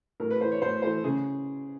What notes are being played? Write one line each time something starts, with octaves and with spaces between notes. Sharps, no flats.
A2 A#4
B4
E3 A3 C5
C#5
A2 C5
E3 A3 C5
C#3 G#4